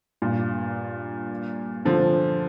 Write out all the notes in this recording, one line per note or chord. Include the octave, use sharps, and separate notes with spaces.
G2 A#2
D3 F3